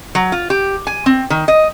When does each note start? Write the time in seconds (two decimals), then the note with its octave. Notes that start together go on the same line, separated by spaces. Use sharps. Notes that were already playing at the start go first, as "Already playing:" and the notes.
0.15 F#3
0.32 F4
0.50 G4
0.87 G#5
1.06 C4
1.30 D#3
1.48 D#5